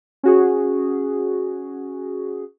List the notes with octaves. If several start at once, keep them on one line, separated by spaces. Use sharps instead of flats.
C#4 F#4 G#4